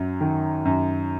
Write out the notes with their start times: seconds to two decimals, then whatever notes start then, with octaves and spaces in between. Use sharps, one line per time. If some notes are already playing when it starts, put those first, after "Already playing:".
Already playing: F#2 F#3
0.21 D#3
0.65 F#2